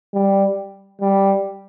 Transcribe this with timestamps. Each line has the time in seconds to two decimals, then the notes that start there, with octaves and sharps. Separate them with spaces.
0.14 G3
1.01 G3